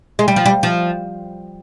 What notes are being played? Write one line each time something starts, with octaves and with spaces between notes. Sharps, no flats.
G#3
G3
F3
G3
F3